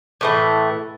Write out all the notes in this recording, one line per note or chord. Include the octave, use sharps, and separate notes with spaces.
A2 E3 A3